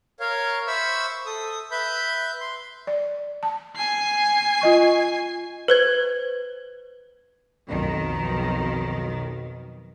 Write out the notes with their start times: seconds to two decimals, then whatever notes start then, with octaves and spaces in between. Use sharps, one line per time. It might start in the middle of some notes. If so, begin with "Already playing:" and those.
0.20 A#4 C#5 F5
0.67 C5 E5 B5 C#6 E6
1.26 A4 D#6
1.71 B4 E5 B5 G6
2.41 C6
2.87 D5
3.43 A5
3.77 G#5 C7
4.61 F4 D#5 C#6
5.68 B4 C5 G#6
7.66 B1 F2 D#3